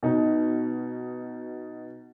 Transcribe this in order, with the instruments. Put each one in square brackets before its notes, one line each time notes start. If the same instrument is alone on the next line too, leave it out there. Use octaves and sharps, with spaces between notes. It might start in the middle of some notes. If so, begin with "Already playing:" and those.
[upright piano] B2 D#4